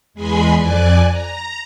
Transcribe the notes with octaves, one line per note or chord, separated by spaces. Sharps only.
E2 G#3 G#4 G#5 B5 C6
F2 D5 G#5 F#6
A#5